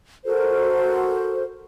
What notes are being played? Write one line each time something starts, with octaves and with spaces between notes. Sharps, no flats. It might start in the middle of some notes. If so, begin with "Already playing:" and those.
F#4 A4 A#4 C5